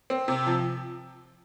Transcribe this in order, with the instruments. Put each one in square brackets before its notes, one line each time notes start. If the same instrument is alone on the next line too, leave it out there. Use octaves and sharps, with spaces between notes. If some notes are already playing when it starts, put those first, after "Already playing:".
[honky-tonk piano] C4
C3
F3